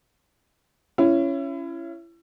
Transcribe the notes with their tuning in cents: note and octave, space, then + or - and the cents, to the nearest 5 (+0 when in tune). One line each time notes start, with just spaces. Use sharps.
C#4 +0 E4 +30